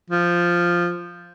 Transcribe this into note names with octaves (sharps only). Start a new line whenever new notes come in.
F3